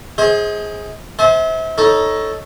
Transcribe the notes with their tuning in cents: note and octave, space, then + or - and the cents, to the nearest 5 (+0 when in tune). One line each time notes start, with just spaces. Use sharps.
G#4 +0 C5 +20 D#5 +40
C5 +0 E5 -35 G#5 +40
D#4 +15 A4 +0 C#5 +0